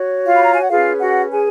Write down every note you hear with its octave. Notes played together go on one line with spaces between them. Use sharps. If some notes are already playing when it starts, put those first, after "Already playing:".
Already playing: F#4 C#5
F4 F5
B5
A#5
G#5
F#5
C#4 F4 G#4 B4 F5
F#4 F#5
G#4 G#5